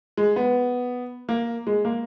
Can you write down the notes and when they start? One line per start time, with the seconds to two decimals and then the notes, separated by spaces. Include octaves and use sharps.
0.17 G#3
0.36 B3
1.29 A#3
1.67 G#3
1.85 A#3